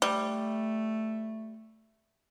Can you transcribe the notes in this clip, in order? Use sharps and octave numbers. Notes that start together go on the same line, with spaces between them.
G3 A3